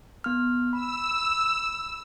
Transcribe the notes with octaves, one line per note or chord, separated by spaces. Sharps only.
B3 F6
B5 E6